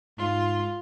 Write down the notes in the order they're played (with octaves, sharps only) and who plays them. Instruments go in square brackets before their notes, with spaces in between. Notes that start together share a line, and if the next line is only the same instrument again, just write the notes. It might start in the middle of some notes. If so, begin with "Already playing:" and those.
[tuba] G#2 [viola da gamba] F4